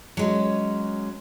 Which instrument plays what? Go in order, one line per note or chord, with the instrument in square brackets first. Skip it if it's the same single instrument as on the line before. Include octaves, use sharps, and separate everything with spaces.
[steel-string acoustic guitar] F#3 G#3 C#4